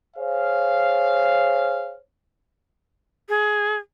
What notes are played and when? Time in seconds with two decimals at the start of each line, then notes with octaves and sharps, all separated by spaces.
0.17 G#4 C5 C#5 F5
3.29 G#4